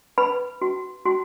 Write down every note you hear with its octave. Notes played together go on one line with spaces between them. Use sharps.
B4 B5
F#4
F#4